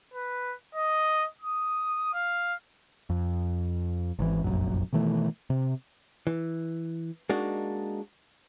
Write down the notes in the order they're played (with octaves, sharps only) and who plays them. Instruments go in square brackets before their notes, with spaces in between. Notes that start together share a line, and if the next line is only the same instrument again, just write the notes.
[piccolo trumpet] B4
D#5
D#6
F5
[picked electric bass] F2
G#1 C3 E3
F1 A#1 F#2
B2 D#3 E3 A3
C3
[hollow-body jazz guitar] E3
G#3 A#3 D4 D#4 F#4